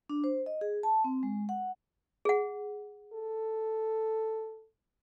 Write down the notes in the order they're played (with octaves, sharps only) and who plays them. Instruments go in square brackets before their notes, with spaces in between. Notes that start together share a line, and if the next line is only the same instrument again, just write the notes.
[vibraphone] D4
C5
D#5
G#4
A5
C4
G#3
F#5
[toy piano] G#4 F#5
[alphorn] A4